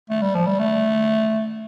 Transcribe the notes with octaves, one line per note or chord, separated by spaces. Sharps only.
A3
G3
F3
G3
A3